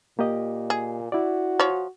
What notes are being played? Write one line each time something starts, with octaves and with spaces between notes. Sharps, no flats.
A#2 A#3 G4 D#5
G#4
E4 F#4 D5
F3 C#5